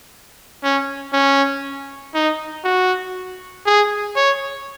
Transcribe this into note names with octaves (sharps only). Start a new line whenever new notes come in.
C#4
C#4
D#4
F#4
G#4
C#5